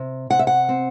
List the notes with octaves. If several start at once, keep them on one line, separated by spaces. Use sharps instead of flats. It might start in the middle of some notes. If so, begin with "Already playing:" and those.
Already playing: C3
C3 F#5
E5
F#5
C4